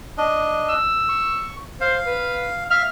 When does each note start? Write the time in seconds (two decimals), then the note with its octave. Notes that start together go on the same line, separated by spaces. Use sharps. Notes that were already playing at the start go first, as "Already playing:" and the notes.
0.18 D4 D#5
0.69 E6
1.09 C#6
1.81 C5 F5
2.06 B4
2.71 E5 F5 F6